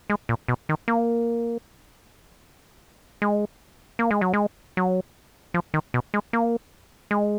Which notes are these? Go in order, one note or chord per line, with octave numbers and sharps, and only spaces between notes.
G#3
A#2
B2
D#3
A#3
G#3
A#3
G#3
F#3
G#3
F#3
F3
D#3
B2
G#3
A#3
G#3